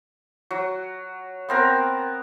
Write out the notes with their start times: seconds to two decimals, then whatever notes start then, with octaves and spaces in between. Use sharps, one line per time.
0.51 F#3
1.49 B3 C4 A#4